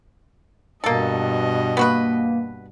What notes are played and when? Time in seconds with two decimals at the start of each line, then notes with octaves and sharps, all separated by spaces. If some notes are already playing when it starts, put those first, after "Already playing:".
0.84 G2 B2 A#3 A4 D#5
1.77 A#3 B3 F#4 B4